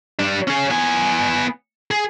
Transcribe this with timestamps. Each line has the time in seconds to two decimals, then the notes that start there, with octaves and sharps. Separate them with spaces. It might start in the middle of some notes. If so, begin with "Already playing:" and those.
0.19 G3 D4
0.48 C#4 G#4
0.70 B3 G#5
1.91 G#4